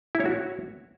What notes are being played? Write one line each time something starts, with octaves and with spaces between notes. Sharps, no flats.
E4
C#5
F#4